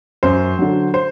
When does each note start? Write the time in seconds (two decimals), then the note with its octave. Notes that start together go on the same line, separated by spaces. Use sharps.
0.23 F#2 C5
0.58 D3 F#3
0.94 C5